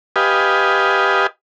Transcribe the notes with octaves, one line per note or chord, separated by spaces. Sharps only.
G4 B4 D#5 F5 G#5